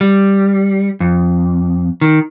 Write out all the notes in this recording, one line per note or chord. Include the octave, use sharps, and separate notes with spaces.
G3
F2
D#3